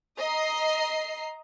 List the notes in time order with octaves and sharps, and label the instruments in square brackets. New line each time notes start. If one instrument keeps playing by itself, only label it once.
[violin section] D#5 A#5 C7